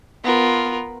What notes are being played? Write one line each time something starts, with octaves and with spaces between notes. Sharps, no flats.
B3 F4 A#4